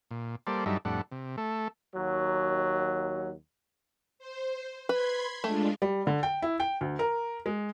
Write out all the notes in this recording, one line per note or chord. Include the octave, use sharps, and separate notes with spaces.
A#2
G3 A#3 A4 C5 D5
G2 F#3 G3 D#4 A4 E5
F2 A2 G3 D4 A4 F#5
C3
A3 A4
D#2 F#3
C5
B4 B5 C6 G#6
G#3 A3 D4 F4
G3
D3
G5
E4
G5
D2
A#4
G#3